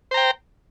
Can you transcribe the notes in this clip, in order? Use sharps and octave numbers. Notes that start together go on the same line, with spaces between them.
C5 G5 A#5